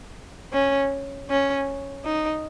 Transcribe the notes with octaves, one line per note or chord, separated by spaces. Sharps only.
C#4
C#4
D#4